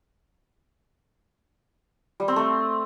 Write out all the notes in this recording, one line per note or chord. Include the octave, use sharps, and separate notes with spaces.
G3
C4
A3